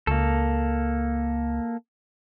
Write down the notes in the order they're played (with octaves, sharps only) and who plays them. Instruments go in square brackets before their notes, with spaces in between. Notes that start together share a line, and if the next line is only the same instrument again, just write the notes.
[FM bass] C#2 [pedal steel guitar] A#3 A4